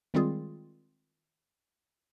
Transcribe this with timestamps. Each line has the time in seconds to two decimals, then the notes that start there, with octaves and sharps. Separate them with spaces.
0.14 D#3 G3 G#3 C4 F4 G#4